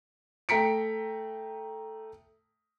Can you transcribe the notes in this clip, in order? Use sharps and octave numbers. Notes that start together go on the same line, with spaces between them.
A3 G5 A#5 B6 C#7 D7